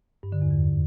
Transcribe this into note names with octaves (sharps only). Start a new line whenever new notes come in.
G2
D3
E2
F2